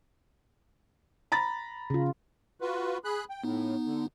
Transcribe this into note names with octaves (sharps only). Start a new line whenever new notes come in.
A#5 B5 A6
C#3 F4
F4 F#4 B4
G#4 B5 F#6
G5
A2 B3 D#4
D3